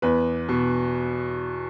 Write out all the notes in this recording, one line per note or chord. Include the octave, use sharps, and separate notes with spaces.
E2 B4
B2